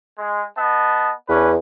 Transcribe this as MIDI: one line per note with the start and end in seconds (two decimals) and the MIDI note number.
0.18 0.42 56
0.56 1.11 59
0.56 1.11 75
0.56 1.11 81
1.29 1.57 40
1.29 1.50 61
1.29 1.50 62
1.29 1.50 71